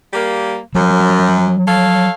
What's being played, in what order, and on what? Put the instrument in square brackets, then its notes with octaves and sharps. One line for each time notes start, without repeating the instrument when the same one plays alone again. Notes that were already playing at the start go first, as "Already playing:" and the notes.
[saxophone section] G3 A#3
[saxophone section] F#2 [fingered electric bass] F3 F#3
[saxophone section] A4 C#5 F5